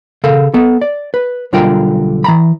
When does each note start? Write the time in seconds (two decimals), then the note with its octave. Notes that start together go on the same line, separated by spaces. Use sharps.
0.24 C#3 A4 A#4 F5
0.54 B3 A4
0.82 D5
1.14 B4
1.53 B1 D3 G3 F4 A#4 G5
2.24 E3 A#5 B5